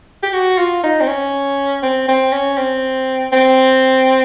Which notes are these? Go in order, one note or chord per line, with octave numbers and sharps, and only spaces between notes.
G4
F#4
F4
D#4
C4
C#4
C4
C4
C#4
C4
C4